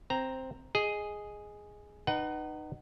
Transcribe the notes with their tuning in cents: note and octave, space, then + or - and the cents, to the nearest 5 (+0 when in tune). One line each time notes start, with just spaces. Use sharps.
C4 +0 A#5 +0
G#4 +0 D#5 +0
D#4 -25 B4 +0 F#5 +25